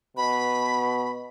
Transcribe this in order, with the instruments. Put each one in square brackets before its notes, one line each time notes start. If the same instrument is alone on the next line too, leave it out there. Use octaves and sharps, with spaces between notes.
[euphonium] B2 [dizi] B5